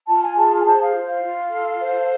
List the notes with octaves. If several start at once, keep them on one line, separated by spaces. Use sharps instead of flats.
F4 A5
G#5
G#4 A5
G#5
C5 A5
F5
F4
F5
F4
A4
C5